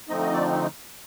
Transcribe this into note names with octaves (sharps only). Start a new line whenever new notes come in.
D3 F3 A3 C4 D#4 D#5
D#5
D5